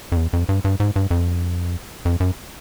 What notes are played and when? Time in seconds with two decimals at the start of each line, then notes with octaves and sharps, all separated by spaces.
0.12 F2
0.17 E2
0.33 F2
0.49 G2
0.65 G2
0.80 G#2
0.96 G2
1.11 F2
2.05 F2
2.20 F#2